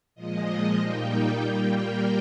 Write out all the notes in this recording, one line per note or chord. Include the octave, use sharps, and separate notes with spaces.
A#2 F3 G#3 D#5
A#2 G3 A#3 D#4 G5
A#2 G3 A#3 G5
A#4